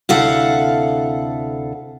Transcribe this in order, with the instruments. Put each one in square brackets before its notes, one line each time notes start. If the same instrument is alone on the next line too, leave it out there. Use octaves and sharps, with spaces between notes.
[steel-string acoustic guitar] D2 C3 E4 A4 F5 F#5